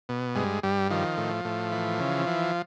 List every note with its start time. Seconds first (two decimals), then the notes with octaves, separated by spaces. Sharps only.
0.09 B2
0.35 G2 G#3
0.63 G2 G3
0.90 D#3 F3
1.17 A2
1.45 A2
1.72 E3
2.00 C#3
2.26 E3